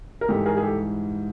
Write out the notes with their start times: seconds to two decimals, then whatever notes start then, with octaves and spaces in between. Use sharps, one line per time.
0.21 A#4
0.28 G#2 E3 G3 G4 A4
0.46 G#4 A#4
0.57 G#4
0.63 G4 A4